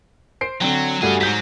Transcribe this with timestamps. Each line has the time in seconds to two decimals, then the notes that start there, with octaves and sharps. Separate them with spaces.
0.41 C5 C7 D7
0.61 D3 F#3 C4
1.02 G2 A3 C#4 F#4 G#4
1.21 G#2 F#3 G6 B6